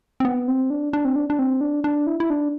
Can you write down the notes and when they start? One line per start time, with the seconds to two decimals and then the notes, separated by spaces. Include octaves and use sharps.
0.20 C4
0.25 B3
0.48 C4
0.70 D4
0.93 D4
1.05 C4
1.16 D4
1.30 D4
1.39 C4
1.61 D4
1.84 D4
2.07 E4
2.20 E4
2.30 D4